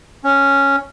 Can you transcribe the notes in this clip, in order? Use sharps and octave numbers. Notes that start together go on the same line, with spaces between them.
C#4